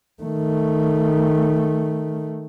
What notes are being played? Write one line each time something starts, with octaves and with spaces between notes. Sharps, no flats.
D#3 A3